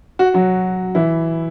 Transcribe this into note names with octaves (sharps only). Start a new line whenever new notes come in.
F#4
F#3 F#4
E3 E4